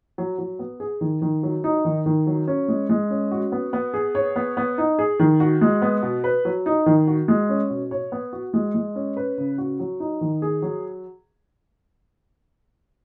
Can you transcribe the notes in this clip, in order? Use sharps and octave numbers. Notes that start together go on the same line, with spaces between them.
F#3
F#3
B3
G#4
D#3
D#3
F#3
D#4
D#3
D#3
F#3
C#4
G#3
G#3
C#4
F#4
B3
B3
G#4
C#5
B3
B3
D#4
G#4
D#3
F#4
G#3
B3
B2
B4
F#3
D#4
D#3
F#4
G#3
C#4
B2
C#5
B3
F#4
G#3
G#3
C#4
B4
C#3
F#4
F#3
D#4
D#3
G#4
F#3